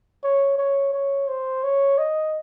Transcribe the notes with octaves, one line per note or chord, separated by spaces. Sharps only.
C#5
C#5
C#5
C5
C#5
D#5